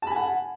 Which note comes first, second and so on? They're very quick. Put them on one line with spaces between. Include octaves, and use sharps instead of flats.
A5 B5 G#5 F#5